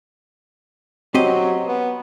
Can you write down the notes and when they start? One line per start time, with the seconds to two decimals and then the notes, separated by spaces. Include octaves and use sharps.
1.14 F#3 C4 G4 D#5
1.67 B3